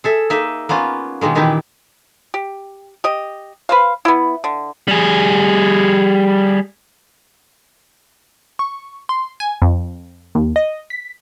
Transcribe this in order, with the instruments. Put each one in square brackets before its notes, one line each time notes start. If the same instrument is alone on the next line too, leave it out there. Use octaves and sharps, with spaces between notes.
[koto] G#4 A4 E5
A#3 D#4 D#5 E5
A#3 B3 C#4 F4
B2 D#3 G#3 A#3
A#2 D#3 E3 D#4 E4 G4
[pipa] G4
G4 D#5
B4 C5 F5
B3 E4
D3
[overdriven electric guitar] G3 G#4
[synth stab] C#6
C6
G#5
F2
D#2
D#5
B6